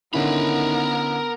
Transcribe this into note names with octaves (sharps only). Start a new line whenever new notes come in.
D3 D#3 B3 C#4 E4 A#4 B5